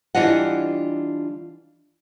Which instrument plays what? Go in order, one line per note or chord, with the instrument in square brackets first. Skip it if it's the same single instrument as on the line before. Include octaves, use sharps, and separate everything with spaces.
[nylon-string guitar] E3 G3 D4 F4 D#5 F#5